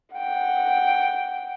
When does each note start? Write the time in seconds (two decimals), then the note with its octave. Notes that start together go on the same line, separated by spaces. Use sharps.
0.16 F#5 G5